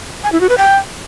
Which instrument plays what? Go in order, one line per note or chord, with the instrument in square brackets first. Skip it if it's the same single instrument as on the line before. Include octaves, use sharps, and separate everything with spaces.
[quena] G#5
E4
F#4
B4
G5